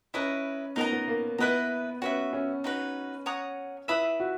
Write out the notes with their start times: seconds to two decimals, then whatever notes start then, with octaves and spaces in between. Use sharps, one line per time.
0.14 C#4 E4 B4 D#5 A#5
0.76 B3 D#4 A#4 D#5 A#5
0.92 B3
1.08 A#3
1.38 B3 E4 B4 D#5 A#5
2.02 C#4 F#4 B4 E5
2.33 C#4
2.64 D#4 F#4 B4
3.26 C#5 F#5 A#5 D#6
3.88 E4 B4 E5 B5 D#6
4.20 F#4